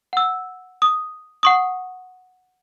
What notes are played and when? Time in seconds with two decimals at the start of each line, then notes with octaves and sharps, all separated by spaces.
0.13 F#5 E6
0.82 D#6
1.43 F#5 C#6 D#6